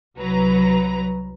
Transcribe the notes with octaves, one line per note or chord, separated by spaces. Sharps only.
C2 F#3 B4 A#5